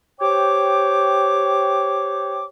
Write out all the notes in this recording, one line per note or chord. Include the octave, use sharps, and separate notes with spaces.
G4 C5 C#5 G5 D6